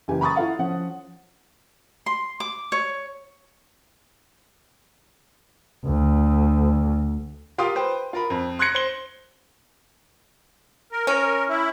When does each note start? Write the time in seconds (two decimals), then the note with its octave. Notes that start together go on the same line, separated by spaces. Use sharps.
0.08 F#1 E3 G4 G#5
0.21 A#5 B5 C#6 D#6 A6
0.36 E4 F4 A4 F5 F#5
0.59 F3 C#4 F#5
2.06 C6
2.40 D6
2.72 C#5
5.85 D2
7.58 F4 G4 A#4 F5 C6 D#6
7.75 B4 C5 G5
8.13 F4 A#4 B5
8.30 F2 C4
8.59 C6 F#6 G#6 A#6 C#7
8.75 C5 G7
10.92 A#4
11.07 C#4 A#4
11.49 E4